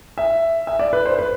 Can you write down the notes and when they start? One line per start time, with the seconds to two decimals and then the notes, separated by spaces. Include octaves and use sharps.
0.18 E5
0.67 E5
0.79 D5
0.93 B4
1.05 C5
1.19 B4